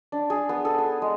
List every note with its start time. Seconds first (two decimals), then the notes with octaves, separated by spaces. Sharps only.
0.12 D4
0.30 G#4
0.49 B3
0.65 A4
0.78 G#4
1.02 G#3